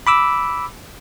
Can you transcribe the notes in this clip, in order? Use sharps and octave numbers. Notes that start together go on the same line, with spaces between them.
B5 D6 E6